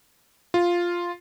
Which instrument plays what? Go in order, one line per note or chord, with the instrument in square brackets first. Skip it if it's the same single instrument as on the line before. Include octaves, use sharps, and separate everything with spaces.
[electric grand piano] F4